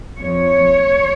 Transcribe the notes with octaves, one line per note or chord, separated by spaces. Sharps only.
F2 F3 C#5